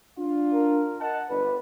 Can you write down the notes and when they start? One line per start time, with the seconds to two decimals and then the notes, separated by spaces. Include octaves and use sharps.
0.18 D4 F4
0.54 A#4
1.00 D#5 F#5 A5
1.29 G1 D3 B4